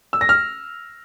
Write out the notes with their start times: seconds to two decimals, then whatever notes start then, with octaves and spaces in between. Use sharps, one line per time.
0.13 E6
0.21 A#6
0.29 F6